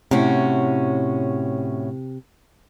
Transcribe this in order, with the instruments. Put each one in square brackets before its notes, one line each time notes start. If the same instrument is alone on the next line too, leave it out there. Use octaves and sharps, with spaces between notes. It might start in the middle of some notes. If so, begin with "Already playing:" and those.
[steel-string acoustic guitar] A2 C#4 F#4 [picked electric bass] C3